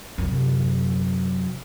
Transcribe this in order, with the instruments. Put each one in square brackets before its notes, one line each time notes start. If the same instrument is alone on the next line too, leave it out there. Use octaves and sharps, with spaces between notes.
[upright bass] F#2 C3